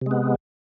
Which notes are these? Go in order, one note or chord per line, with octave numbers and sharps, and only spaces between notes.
C3 G#3 B3